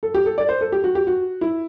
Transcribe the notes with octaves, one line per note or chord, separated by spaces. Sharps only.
A4
G4
A4
D5
C5
A4
G4
F#4
G4
F#4
E4